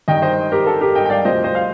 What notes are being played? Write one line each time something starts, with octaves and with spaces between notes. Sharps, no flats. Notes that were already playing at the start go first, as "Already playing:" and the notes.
G2 D#3 D#5 G5
C5 D#5
G4 A#4
A4
G4 A#4
D#5 G5
G5
D5 F5
D2 C3 F3 C5 D#5
C5 D#5
F5